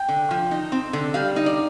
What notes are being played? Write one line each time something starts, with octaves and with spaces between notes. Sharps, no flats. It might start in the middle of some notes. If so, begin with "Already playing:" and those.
Already playing: G5
D3
F3
D#4
C4
D3
G3 F5
D#4
D5